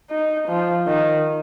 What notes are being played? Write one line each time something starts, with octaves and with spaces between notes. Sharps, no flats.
D#4
F3
D#3